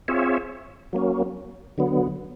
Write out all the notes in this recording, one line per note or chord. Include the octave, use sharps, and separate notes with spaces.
C4 F4 G#4 C#5 E5
F#3 A#3 C#4
D3 F#3 B3